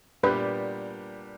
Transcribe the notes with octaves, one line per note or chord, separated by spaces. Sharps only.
A#2 G3 B3 D4 G4 B4